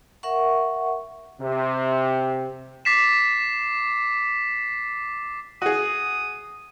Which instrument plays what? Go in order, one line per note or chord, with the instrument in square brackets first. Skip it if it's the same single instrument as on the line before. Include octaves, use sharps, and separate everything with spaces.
[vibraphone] A#4 E5 F#5 C#6
[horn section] C3
[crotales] D6 A6 B6 C7 E7
[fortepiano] F#4 G#4 [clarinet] D#6